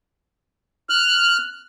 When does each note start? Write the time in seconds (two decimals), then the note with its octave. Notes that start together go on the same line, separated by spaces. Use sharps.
0.89 F6 F#6